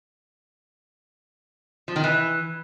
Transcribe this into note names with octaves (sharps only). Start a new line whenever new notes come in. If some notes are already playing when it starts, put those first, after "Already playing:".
F3
D#3
E3